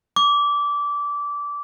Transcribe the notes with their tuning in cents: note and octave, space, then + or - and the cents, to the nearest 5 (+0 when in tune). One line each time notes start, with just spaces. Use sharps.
D6 -20